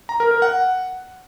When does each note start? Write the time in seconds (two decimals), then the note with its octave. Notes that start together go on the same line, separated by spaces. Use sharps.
0.09 A#5
0.20 A#4
0.31 A#4
0.42 F#5